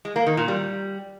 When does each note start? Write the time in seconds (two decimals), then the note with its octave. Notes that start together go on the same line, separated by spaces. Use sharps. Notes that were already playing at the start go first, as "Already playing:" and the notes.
0.05 G#3
0.16 A#3
0.26 D#3
0.37 A#2
0.48 G3